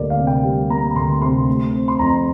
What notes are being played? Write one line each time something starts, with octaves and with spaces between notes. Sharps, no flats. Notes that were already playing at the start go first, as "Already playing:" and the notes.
Already playing: D2 G3 A#3 D5
F5
C3
G5
G3
A#3 A#5
A#5
D2 C6
C3 C6
A3
C4
C6
F2 A#5